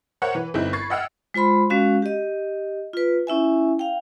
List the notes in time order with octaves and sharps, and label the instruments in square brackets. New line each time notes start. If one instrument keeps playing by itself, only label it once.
[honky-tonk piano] A#4 C5 C#5 E5 F#5 G5
E3 B4
G1 C4 D#4 E4
B5 C#6 G#6 A6 C7
D#5 E5 F#5 G5 E6 F6
[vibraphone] G#3 F4 C5 B5 C6
G#3 C#4 F#4 F5
G4 D#5
F4 B4
C#4 E4 E5 G#5
F5 G5